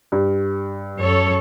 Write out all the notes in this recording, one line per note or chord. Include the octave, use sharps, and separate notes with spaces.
G2
F#2 A4 C#5